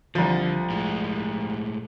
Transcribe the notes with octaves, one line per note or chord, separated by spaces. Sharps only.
C2 D3 F3
A2 G#3